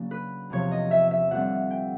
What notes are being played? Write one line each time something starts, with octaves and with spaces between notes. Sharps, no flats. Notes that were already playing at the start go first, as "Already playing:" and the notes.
Already playing: C#3 F#3 A#3 D4
B4
E2 C3 F3 C#5
D#5
E5
E5
F2 D3 G3 C4 F#5
G5